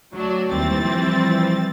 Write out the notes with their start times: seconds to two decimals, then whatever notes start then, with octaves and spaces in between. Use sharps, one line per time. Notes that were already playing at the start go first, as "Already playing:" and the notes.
0.13 D2 F#3 D4
0.53 D#2 E3 G3 C4 A6
0.81 F3 G3